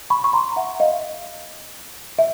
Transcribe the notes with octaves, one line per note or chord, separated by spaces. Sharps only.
B5 C#6
C#6
A#5 C6
E5 F#5
D#5 F5
E5